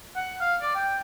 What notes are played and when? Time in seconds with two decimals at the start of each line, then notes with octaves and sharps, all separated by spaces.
0.16 F#5
0.41 F5
0.61 D5
0.75 G5